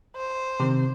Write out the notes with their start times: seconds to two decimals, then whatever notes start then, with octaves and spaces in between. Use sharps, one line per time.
0.16 C5
0.60 C3 D#3 C4